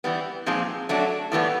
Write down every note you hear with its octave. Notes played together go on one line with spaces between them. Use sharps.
E3 G3 B3
A#2 F3 G#3 C4 D#4
F#3 A3 D4
A2 E3 G3 B3